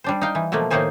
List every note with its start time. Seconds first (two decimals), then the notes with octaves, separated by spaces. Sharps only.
0.04 G3 D4 C5
0.21 D#4 F5 G5
0.35 E3
0.52 B2 F3 A3 A#3
0.70 A2 D#3 A#3 D#4 C5 G#5